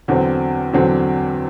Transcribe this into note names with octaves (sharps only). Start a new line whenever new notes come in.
E2 D3 F#3 C4
E2 D3 F#3 C4